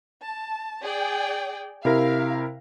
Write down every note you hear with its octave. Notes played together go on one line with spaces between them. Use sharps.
A5
G#4 D5 G5
C3 E4 A#4 F5